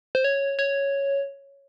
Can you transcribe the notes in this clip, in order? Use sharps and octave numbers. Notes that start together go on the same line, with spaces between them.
C5
C#5
C#5